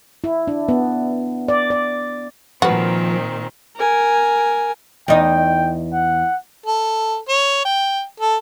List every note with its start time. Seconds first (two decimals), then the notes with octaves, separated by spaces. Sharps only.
0.24 E4
0.47 D4
0.69 B3
1.48 D5
1.70 D5
2.62 A#2 D#3 F3 C4 F#4 B4
3.76 A#4 G#5
5.08 E2 D#4 G5
5.93 F#5
6.66 A4
7.28 C#5
7.65 G5
8.20 A4